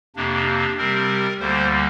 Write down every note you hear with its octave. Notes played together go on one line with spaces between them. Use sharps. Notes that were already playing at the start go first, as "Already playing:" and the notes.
F2 C3 A#3 D4
D4
C3 G3 C4 A#4
D2 D3 G3 A#3 C5